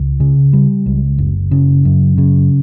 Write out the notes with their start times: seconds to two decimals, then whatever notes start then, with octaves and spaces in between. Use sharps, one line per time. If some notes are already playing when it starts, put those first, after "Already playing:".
Already playing: C#2
0.20 C#3
0.53 G3
0.86 C#2
1.18 F#1
1.51 C#3
1.85 F#2
2.18 C#3